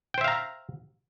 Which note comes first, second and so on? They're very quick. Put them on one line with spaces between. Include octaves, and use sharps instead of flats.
G5 C5 E5 F5 A#5